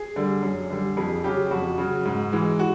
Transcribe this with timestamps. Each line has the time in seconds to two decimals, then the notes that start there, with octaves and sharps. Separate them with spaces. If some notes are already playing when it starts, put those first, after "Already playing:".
Already playing: G#4
0.16 D3 G3
0.43 F#2
0.70 D3 G3
0.97 F2 G#4
1.24 C#3 F#3 G4
1.51 F2 F#4
1.78 C#3 F#3
2.05 G#2
2.32 E3 G#3
2.59 F#4